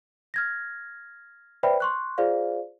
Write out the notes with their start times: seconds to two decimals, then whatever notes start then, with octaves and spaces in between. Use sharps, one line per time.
0.34 F6 G#6 A#6
1.63 B4 C5 D5 E5 G5 B5
1.80 C6 C#6 F#6
2.18 F4 G#4 C5 D5 F5